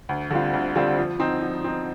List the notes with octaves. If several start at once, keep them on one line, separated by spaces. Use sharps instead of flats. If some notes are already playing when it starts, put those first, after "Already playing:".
D2
D3 G3 C4 F4
D2
D3 G3 C4 F4
F3
C4 D#4
F3
C4 D#4